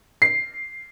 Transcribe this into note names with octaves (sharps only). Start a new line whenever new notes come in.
C7